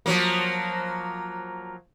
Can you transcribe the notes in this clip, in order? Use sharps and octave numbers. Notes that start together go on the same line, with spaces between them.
F3 F#3 A#3